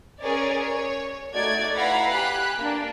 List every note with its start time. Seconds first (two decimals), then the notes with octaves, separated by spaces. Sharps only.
0.21 C#4 G#4 A#4 C#5 D5
0.61 C#5
1.33 A3 D#4 F#4 D5 G#6
1.74 E4 B4 F5 F#5 A#5 B5
2.11 G4 G#5 B5 F#6
2.59 A#3 D4